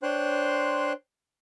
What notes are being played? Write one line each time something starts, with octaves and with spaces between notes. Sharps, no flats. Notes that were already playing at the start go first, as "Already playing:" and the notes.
D4 C5 C#5 G5 C6 F#6